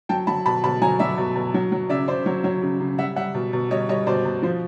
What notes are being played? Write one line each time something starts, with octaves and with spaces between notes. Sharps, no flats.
F#3 G5 A5
F#3 A5 B5
B2 A5 B5
B2 A5 B5
F#3 G#5 A#5
F#3 D5 E5
B2
B2
F#3
F#3
C#3 D5 E5
C#3 C5 D5
F#3 C#5
F#3 C#5
C#3
C#3
G3 E5 F#5
G3 E5 F#5
B2
B2
G3 C#5 D#5
G3 C#5 D#5
B2 C5 D5
B2
F3 C5